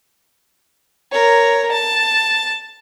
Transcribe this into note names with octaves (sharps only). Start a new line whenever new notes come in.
A#4 C#5
A5